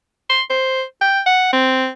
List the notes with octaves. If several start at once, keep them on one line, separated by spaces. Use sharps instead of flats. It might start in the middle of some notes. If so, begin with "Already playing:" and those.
C6
C5
G5
F#5
C4